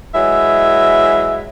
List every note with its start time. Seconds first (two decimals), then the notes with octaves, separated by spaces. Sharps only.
0.15 E3 F#3 G#3 E5